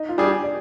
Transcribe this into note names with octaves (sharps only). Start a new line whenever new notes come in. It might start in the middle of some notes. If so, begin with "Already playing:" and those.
Already playing: D#4
F4
G3 D4 G#4
G4
D5